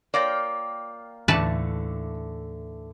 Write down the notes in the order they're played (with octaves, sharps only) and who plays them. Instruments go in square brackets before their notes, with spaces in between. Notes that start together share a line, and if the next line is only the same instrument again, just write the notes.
[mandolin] A#3 F4 G5 [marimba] C#5 A#6 [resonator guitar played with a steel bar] D5
[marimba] D#2 A2 [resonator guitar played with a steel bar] D3 E3 A3 [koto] B4 D5 A5